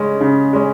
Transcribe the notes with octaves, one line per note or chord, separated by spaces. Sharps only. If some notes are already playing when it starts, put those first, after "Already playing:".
Already playing: C#3 G#3 C#4
C#3
G#3 C#4